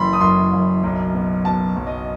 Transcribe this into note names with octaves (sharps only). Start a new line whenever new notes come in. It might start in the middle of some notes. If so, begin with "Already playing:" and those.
Already playing: F#1 E3 B5 C6
D#6
F#2 C6
F#1
B1
B2
B2 A5
B1
D#5